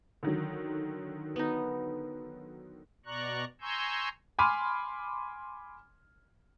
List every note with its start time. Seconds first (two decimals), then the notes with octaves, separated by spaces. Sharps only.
0.23 D3 D#3 F#3
1.36 B3 D#4
3.06 B2 D5 A#5 C#6 F#6
3.61 G#5 A#5 C6 C#6 E6 G6
4.39 G#5 B5 C6 D6 F6 D#7